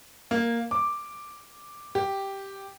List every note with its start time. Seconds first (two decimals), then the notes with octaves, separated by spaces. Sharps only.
0.31 A#3
0.71 D6
1.95 G4